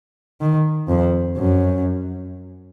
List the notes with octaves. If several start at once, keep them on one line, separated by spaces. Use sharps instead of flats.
D#3
F2
F#2